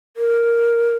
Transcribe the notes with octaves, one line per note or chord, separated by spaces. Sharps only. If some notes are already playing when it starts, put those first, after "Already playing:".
A#4